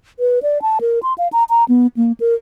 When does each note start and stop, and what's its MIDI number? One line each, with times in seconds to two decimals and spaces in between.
0.19 0.39 71
0.43 0.61 74
0.62 0.78 81
0.81 0.99 70
1.03 1.13 84
1.18 1.28 77
1.33 1.44 82
1.50 1.64 82
1.69 1.87 59
1.97 2.12 58
2.20 2.35 70